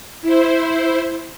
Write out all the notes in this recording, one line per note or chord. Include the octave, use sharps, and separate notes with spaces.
E4 C5